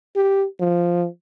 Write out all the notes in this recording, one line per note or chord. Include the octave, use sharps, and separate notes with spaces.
G4
F3